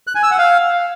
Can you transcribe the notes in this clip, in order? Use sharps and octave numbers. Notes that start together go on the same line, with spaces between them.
F#6
G#5
E6
F#5
F5